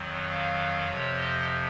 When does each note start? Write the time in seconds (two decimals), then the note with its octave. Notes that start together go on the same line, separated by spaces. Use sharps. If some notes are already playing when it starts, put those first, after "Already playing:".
Already playing: F2 D#3 F#3
0.31 F5
0.87 F2 C3 F3 C#5
1.16 D#5